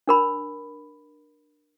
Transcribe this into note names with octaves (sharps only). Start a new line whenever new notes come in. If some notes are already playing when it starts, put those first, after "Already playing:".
D4 A#4 B5